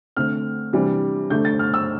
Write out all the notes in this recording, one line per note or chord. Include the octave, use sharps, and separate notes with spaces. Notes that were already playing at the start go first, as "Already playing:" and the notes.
D3 A3 C4 F6
C3 E3 G3 D4
D3 A3 D4 G6
A6
F6
E6